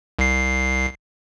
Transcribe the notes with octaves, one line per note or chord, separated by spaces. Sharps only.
C2 C7